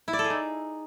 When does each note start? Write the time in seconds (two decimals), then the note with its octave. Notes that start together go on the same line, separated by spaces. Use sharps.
0.08 E4
0.13 D5
0.19 A4
0.24 G#4
0.30 D#4